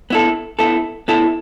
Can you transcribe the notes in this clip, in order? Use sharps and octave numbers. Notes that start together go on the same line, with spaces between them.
B3 E4 A4
B3 E4 A4
B3 E4 A4